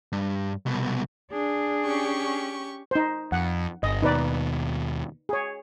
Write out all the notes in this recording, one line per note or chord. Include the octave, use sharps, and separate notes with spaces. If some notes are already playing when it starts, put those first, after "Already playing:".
G2
C2 B2
D4 G#4
C#4 G4 C#6
D#4 C5
F2 F#5
G1 D#5
D#2 B2 D#4 B4 D5
G#4 C#5